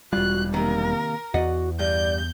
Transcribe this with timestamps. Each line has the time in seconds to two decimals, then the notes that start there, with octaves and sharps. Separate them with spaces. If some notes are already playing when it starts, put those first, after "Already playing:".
0.13 E1 G3 F4 F#4 F#6
0.54 C3 D#3 A#3 A#4
1.34 E2 F#4 D5 D#5 F#5
1.79 G2 D5 G6